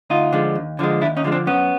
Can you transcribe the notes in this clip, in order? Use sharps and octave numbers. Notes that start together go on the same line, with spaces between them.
D2 D#4 F4
D3 F3 G#3
D#2
D3 F3 G#3
D#2 D4 E4
C#4 D#4
D3 F3 G#3
C4 D4
F#2 B3 C#4